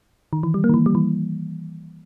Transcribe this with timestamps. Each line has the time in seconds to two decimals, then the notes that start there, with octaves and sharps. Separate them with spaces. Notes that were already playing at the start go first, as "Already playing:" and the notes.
0.33 D#3
0.43 E3
0.54 G3
0.64 A#3
0.69 D#3
0.74 E3
0.86 G3
0.95 E3